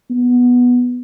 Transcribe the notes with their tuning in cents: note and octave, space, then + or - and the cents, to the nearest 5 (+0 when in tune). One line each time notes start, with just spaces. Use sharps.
B3 -5